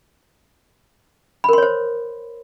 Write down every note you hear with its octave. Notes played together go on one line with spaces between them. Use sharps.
A#4 C5 C#5 B5 C6